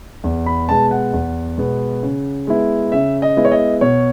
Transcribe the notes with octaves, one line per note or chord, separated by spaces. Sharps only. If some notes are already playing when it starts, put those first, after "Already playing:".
E2
B5
B2 G#3 B3 A5
F#5
E2
B2 G#3 B3
C#3
G#3 B3 E4
C#3 E5
D#5
G#3 B3 E4
C#5
D#5
B2 C#5